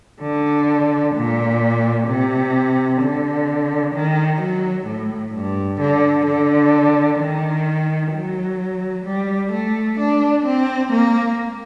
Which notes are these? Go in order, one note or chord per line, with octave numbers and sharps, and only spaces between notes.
D3
A#2
C3
D3
D#3
F#3
A2
G2
D3
D3
D#3
F#3
G3
A3
D4
C4
A#3